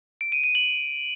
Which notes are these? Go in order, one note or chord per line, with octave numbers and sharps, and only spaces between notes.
D7
D#7
D#7
F#7